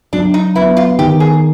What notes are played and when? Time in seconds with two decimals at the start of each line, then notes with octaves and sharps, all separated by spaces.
0.13 F#3 D4
0.34 D#4
0.55 B3 E4
0.77 F4
0.98 D#3 G4
1.20 G#4